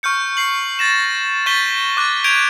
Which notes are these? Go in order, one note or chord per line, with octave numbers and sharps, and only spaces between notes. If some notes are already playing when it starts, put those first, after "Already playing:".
C#6 F6 G6 C#7
C7 F#7
A6 A#6 E7
C#6 G6 A6 B6 D#7 G7
D6 F#6 A6
G6 G#6 D7 D#7 F7